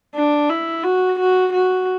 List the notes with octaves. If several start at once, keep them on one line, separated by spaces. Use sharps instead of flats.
D4
E4
F#4
F#4
F#4